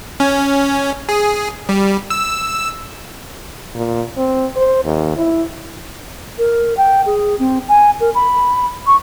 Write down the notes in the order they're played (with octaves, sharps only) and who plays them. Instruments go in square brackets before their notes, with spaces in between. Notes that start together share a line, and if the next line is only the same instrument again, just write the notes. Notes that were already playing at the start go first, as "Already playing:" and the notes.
[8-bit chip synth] C#4
G#4
G3
E6
[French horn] A#2
C4
C5
D#2
E4
[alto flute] A#4
G5
G#4
C4
G#5
A#4
B5
C#6